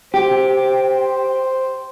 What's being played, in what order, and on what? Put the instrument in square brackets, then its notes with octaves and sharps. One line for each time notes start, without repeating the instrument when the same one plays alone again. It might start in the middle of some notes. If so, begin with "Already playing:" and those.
[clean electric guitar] G4 [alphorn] C5